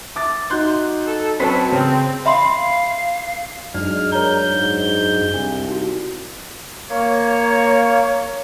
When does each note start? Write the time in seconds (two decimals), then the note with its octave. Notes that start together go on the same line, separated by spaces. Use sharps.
0.15 E5 D6 A6
0.50 D#4 F#4 C6 F#6 G6
1.06 A4
1.40 F#3 C4 C#4 B4 A5 B6
1.72 C#3 C4
2.26 E5 F5 B5 C6
3.74 F#2 F#3 G#3 D4 D#4 D5 F6
4.12 A#4 C#5 A#5 G6
4.51 G#2
5.34 C2 D4
5.68 D#4 F#4
6.89 A#3 C#5